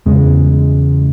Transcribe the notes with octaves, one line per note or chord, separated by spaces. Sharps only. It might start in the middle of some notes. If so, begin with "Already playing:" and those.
E2 C#3 G#3